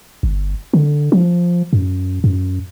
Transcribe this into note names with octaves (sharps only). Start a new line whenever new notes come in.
G1
D3
F3
F#2
F#2